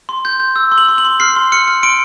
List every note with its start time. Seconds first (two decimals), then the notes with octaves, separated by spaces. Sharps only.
0.09 C6
0.25 G6
0.40 G6
0.56 E6
0.72 C6
0.78 F#7
0.89 C6
0.98 F#7
1.05 C6
1.20 F6 C7
1.36 C6
1.52 F6 C#7
1.68 F6
1.83 C6 D7